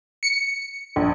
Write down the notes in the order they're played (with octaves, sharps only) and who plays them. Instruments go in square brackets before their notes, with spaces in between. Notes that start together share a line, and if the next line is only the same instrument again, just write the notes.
[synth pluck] C#7
[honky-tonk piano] A#1